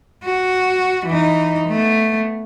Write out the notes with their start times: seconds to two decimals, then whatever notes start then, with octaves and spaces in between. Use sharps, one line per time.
0.24 F#4
1.06 E3 D#4
1.68 A3 B3